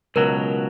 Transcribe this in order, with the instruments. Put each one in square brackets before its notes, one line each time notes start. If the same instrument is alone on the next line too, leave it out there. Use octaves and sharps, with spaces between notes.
[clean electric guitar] C#2 B2 F#3 [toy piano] A#4